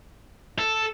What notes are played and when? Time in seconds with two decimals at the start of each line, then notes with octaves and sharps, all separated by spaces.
0.59 A4